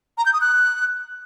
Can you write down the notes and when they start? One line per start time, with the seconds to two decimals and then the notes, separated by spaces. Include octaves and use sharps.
0.18 A#5
0.26 G6
0.33 D#6
0.41 F#6